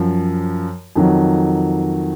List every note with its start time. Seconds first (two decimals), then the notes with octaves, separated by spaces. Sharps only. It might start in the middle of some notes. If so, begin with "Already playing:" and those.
Already playing: F#2 F3
0.96 F2 D#3 F#3